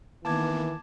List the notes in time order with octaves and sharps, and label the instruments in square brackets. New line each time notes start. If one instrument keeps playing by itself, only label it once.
[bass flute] D#3 [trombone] E3 [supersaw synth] A#3 B3 [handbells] A5 D6 G#6